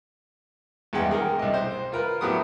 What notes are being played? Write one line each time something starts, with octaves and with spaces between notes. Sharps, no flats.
E2 G2 G#3 F#5 G5
G#4 A#4 G5
C2 D#5
C5
F4 A#4 B4
A2 F#3 A3 B3 G4 D#6